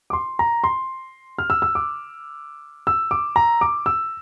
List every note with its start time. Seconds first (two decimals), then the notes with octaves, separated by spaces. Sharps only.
0.10 D6
0.13 C6
0.39 A#5
0.64 C6
1.38 F6
1.50 E6
1.62 E6
1.75 D6
2.87 E6
3.11 D6
3.36 A#5
3.61 D6
3.86 E6